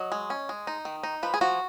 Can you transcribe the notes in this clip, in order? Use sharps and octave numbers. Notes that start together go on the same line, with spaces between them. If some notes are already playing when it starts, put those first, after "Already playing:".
Already playing: F#3 D#5
G#3
C#4
G#3
D#4
D#3
D#4
F3 B4
G#4
F3 F#4